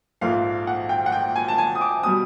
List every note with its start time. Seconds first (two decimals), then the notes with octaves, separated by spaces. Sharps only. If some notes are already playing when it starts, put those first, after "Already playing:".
0.21 A#1 G#2 F3 A3 F5
0.67 F#5
0.89 G5
1.06 F#5
1.12 G5
1.36 G#5
1.48 A5
1.58 G#5
1.75 D#6
1.81 D6
2.03 B2 G3 D#6